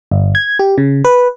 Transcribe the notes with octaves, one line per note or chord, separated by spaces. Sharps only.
G1
G#6
G4
C#3
B4